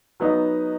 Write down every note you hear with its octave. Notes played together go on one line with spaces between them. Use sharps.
F#3 B3 D#4